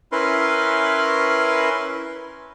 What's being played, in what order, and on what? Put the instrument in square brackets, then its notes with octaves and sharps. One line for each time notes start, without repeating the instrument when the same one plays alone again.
[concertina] C#4 E4 A#4 B4 C6